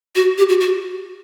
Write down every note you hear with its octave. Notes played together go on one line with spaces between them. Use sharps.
F#4
G4
F#4
F#4